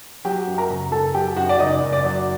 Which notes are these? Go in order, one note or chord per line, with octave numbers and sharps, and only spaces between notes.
F#3 G4 G5
F#2
A#4 A#5
F#1
F#1 A4 A5
F#3 G4 G5
F#2 F#4 F#5
D5
F#1 D#4 D#5
F#1
D5
F#3